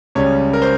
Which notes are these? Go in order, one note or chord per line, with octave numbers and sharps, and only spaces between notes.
C#2 C#3 G3 C#4 C#5
A#4
C5